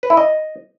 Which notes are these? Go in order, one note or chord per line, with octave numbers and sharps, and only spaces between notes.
B4
E4
D#5